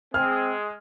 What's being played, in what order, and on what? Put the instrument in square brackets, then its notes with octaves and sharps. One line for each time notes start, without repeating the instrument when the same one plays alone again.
[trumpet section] G#3 G#4 [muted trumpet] C4 [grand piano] F6